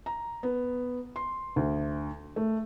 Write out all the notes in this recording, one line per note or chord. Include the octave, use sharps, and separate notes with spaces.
A#5
B3
C6
D2
A3